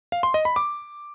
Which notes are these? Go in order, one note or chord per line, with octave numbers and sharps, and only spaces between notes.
F5
C6
D#5
B5
D6